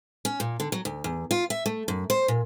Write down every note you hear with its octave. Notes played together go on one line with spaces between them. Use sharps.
C#4
A#2
D3
F#3
D2
E2
F4
E5
A3
F#2
C5
A#2